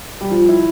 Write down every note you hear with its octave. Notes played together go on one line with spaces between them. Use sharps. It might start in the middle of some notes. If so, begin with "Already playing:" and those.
G3
F3
E4